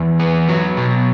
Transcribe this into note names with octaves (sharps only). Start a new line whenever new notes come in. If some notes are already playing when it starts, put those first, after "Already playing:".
Already playing: E2
B3
F#3
B2